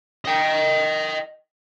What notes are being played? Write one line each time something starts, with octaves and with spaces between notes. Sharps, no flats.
D#5 G5